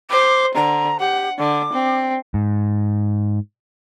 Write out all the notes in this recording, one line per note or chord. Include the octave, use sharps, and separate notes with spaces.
C5 D6
D3 A#5
G4 F#5
D3 D6
C4
G#2